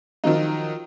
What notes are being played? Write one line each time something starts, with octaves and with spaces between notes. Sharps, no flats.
D#3 F3 F#3 D#4